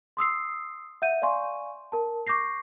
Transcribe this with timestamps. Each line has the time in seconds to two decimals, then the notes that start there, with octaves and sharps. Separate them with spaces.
0.17 C6 D#6 E6 C7
1.02 E5 F#5 G6 D#7
1.22 D5 F5 G#5 C6 C#6
1.92 A#4 A5
2.27 C#6 D6 G6 A#6 C7